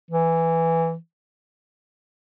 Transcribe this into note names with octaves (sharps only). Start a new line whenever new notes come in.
E3